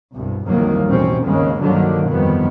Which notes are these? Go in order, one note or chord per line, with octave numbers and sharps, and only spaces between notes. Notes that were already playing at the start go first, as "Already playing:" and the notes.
C2 G2 B2
G1 C2 F2 D#3 F#3 A#3
A1 D#2 B2 C4 C#4
G#1 D#2 C#3 G#3 A#3
C2 G2 D3 D#3 F#3 A#3
G1 F2 C3 D#3 G3 B3